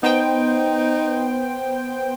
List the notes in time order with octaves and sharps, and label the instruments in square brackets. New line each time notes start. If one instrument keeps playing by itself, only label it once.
[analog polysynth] B3 C5 G5 [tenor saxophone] D#4